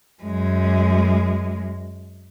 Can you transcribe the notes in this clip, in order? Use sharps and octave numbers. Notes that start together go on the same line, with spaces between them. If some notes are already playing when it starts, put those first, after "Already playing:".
F#2 G#3